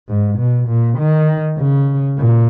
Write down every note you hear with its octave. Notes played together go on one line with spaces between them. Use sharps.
G#2
B2
A#2
D#3
C#3
A#2